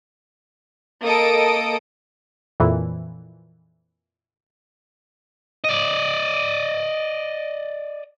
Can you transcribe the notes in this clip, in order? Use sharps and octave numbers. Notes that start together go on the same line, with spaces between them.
A#3 A4 D#5 D#6 D7
F2 A#2 E3
D5 D#5